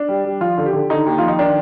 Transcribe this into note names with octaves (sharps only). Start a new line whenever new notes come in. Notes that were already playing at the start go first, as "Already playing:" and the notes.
Already playing: D4
G3
G3
F3 F4
D3
G4
D3
D3 D#4
D#2
F3 F4
D#4
D#3 D4